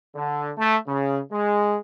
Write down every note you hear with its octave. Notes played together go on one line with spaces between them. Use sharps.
D3
A3
C#3
G#3